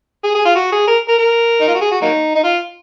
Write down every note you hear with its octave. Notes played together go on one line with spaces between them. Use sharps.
G#4
G#4
F4
F#4
G#4
A#4
A#4
A#4
D#4
F4
F#4
G#4
F#4
F#3 A#3 D#4
D#4
F4